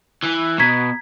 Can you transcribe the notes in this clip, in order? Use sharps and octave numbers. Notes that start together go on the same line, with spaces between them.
E3
B2 A#5 G#6 B6